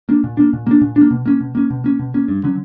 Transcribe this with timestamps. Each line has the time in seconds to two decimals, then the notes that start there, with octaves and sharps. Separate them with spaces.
0.09 A#3 D4
0.24 A#2
0.37 A#3 D4
0.53 A#2
0.67 A#3 D4
0.81 A#2
0.96 D4
1.01 A#3
1.11 B2
1.26 A#3 C#4
1.41 B2
1.55 A#3 C#4
1.70 B2
1.84 A#3 C#4
1.99 B2
2.14 A#3 C#4
2.28 G2
2.43 D3 F#3 C#4